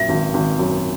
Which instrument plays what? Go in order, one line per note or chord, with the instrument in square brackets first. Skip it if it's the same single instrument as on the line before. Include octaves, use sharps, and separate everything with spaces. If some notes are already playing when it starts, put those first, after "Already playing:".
Already playing: [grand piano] A#1 F#2 [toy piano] E5
[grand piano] G#1
G#1
F#2